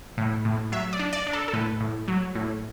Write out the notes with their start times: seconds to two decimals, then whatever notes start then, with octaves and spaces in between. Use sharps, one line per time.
0.18 A2
0.45 A2
0.72 F#3 E5
0.93 D5
0.99 D4
1.13 D5
1.27 D4
1.33 A4
1.48 A4
1.53 A2 B4
1.80 A2
2.08 F#3
2.35 A2